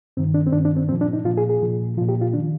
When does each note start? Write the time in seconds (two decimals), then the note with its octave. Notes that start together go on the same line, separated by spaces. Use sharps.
0.17 G2 D#3 C4
0.34 D4
0.47 C4
0.52 G2 D#3 D4
0.60 C4
0.65 D4
0.77 C4
0.89 A#2 C4
0.92 F3
1.01 D4
1.13 D#4
1.24 A#2 F3 F4
1.37 G#4
1.50 G#4
1.62 A#2 F3
1.97 F3 F4
2.01 A#2
2.09 G4
2.21 F4
2.34 D#3 D4